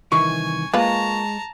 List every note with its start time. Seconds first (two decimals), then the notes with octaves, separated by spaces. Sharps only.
0.12 C2 D#3 E3 G#5 C#6
0.74 G#3 A#3 F4 B4 A5 A#5